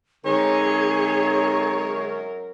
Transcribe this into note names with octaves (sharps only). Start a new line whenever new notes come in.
F#2 D3 G#3 C4 D#4 G#4 A#4 C#5